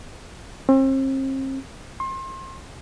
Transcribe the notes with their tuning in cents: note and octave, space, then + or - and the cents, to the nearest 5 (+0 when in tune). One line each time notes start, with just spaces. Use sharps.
C4 +40
C6 +30